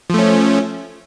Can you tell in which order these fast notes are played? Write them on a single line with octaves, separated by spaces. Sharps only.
F3 A3 C#4